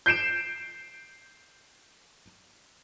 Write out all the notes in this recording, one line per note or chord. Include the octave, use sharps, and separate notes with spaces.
G6 C7 D7 E7